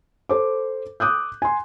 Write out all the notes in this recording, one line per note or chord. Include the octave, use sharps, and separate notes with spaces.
A4 C5 D6
D6 D#6 F#6 G6
G#5 C6